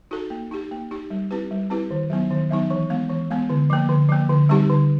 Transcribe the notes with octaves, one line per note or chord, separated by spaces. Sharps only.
D#4 F#4 A4
A#3
D#4 G4
A#3
D#4 G4
G3
C4 E4 G4 B4
G3
C4 E4 G4 B4
D#3
F#3 B3 D#4
D#3
F#3 B3 D#4
E3
G#3 B3
E3
G#3 B3
D3
F3 A#3
D3
F3 A#3
D3
G3 C4 D#4 G4
D3